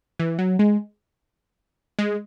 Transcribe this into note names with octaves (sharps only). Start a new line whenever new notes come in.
E3
F#3
G#3
G#3